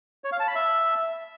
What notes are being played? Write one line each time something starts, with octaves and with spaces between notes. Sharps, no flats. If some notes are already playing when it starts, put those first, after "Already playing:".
C#5
F5
A5
B5
E5